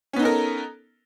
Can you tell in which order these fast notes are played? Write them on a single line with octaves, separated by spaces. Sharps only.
C#4 B3 D#4 A4 A#4